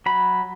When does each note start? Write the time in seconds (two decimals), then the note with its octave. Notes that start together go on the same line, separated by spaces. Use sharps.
0.06 F#3 B5